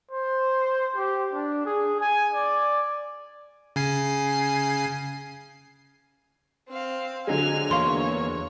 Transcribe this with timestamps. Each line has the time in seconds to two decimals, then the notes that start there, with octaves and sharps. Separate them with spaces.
0.11 C5
0.96 G4
1.33 D4
1.66 G#4
2.00 G#5
2.33 D5
3.76 C#3 G#5 C7
6.69 C4 F5
7.27 D3 F#3 G#3 G#5 F7
7.71 E2 A#3 C#5 F5 C6